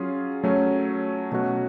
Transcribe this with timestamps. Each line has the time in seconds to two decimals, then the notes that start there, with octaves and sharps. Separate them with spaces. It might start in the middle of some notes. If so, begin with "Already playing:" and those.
Already playing: F#3 C#4 F4 G#4
0.44 F#3 A3 C#4
1.32 B2 F#3 A3 C#4 F#4